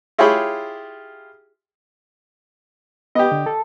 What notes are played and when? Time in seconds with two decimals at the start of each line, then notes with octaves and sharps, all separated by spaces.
0.18 E4 F4 G4 G#4 C#5 B5
3.15 B3 G4 D#5
3.31 D3
3.46 A4